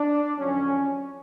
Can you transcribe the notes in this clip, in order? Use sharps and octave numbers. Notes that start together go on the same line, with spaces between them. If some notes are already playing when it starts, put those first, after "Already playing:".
Already playing: D4
F2 D3 F#3 C#4